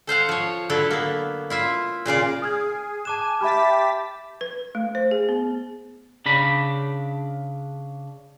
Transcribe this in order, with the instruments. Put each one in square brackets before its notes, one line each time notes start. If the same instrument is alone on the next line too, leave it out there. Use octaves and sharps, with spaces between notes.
[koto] A4 C5 F5 F#5
F3 C#5
D3 F#3 E4 A4
A#3 B3
E4 F4 E5
A#2 C#3 F4 D5
[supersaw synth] G#4 [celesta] D#6 F6 G#6
[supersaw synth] G#5 [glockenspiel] A5 D6 E7 [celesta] F#6
[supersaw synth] G4 A6 B6 [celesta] E5 B5 F6
[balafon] B4
A3
C5
G#4
B3
[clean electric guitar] C#3 D4 B5